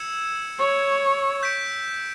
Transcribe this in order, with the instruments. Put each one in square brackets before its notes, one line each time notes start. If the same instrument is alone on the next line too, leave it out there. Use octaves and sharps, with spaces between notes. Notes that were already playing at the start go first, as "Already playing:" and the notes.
Already playing: [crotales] E6 G#6 C#7 E7
[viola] C#5
[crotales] G6 B6 D7